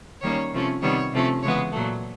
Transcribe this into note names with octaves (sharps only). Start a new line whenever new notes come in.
D#3 G3 A#3 C#4 C#5
C3 F3 A3 C#4
C3 D#3 G3 B3 C#5
C3 F3 A3 C#4
C#3 E3 G#3 B3 C#5
A#2 F#3 A3